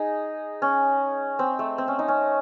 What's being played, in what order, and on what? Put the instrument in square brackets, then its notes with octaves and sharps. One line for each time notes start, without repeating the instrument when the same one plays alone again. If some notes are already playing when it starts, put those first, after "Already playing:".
Already playing: [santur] D#4 G#4
C#4
C4
A3
C4
C#4
D#4
C#4